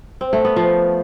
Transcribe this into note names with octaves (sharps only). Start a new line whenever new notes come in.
C4
A3
B3
F3